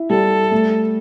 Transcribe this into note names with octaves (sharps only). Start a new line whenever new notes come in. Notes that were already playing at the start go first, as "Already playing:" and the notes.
Already playing: E4
G3 A4
A3